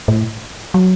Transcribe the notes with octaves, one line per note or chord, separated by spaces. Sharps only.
A2
F#3